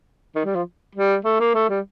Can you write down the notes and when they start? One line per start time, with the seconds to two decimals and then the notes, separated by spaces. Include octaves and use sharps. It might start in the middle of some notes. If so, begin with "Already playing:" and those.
0.36 D#3
0.45 G3
0.55 F3
0.95 G3
1.25 A3
1.40 A#3
1.55 A3
1.69 G3